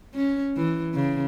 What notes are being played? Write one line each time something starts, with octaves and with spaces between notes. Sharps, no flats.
C#4
E3
C#3